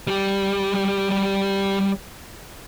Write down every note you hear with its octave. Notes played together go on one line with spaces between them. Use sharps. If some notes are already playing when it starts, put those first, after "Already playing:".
G3 G4